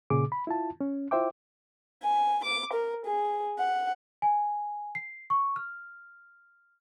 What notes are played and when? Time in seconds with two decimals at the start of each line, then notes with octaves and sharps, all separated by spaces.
0.10 A#2 C#3 G#4 D6
0.32 B5
0.47 E4 F4 A5
0.81 C#4
1.11 E4 F4 C5 E5 G5 D6
2.03 G#5
2.44 D6
2.73 A#4
3.06 G#4
3.58 F#5
4.22 G#5
4.95 C7
5.30 C#6
5.56 F6